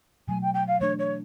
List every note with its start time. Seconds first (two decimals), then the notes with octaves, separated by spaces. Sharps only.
0.28 B2 F#3 A3 G#5
0.42 G5
0.54 G5
0.67 F5
0.80 E3 A3 D4 C#5
0.98 C#5